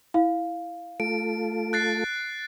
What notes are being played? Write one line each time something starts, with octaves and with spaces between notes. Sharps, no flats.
E4 F5
A3 F4 A4 D7
F#6 A6 C7